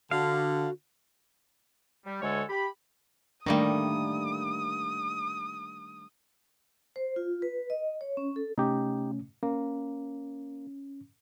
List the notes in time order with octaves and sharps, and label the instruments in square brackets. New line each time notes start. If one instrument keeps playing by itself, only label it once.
[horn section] D3 [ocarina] F#4 [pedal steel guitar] F5
[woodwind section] G3
D2 D3 G#3 A4 C#5 G#5
G4 B5
[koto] D#3 G3 A#3 [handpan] A3 D4 [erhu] D#6
[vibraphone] C5
F4
B4
D#5
C#5
C#4
A4
[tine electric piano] C3 A3 C#4 [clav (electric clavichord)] D#4 G4
[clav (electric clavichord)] A#3 [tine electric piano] C#4